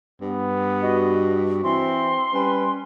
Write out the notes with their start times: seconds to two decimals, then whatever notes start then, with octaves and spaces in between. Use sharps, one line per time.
0.22 G2 B3
0.82 F#4 D#5
1.64 E3 C4 C6
2.34 G3 C#4 B4